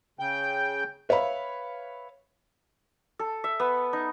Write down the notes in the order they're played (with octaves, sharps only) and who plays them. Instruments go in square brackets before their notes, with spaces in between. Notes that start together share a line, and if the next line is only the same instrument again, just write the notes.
[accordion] C#3 G5 G6
[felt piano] B4 C#5 E5 F5 B5
[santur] A4
E5
B3
D#4